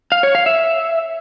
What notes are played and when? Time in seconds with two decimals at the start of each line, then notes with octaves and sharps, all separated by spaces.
0.12 F5
0.23 C#5
0.35 F5
0.46 E5